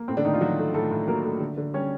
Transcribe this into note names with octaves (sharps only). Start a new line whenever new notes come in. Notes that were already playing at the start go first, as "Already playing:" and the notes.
Already playing: A#3
A2 C4
D3 D4
A2 D#3 D#4
F3 F4
F#3 F#4
A3
A2 A3 A4
A2
F#3 A#3 A#4
A3
D3
D3
G3 C#4 C#5